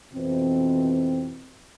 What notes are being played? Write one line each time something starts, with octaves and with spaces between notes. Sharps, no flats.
F2 B2 E3 C4